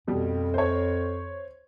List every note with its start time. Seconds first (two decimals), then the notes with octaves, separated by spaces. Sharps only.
0.07 F2 B2 G3
0.54 C5 C#5